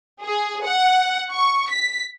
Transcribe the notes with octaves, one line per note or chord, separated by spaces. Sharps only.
G#4
F#5
C#6
B6